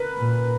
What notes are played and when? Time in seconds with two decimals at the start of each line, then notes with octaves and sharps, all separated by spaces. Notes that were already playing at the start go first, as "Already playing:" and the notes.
Already playing: A#4 B4
0.18 A#2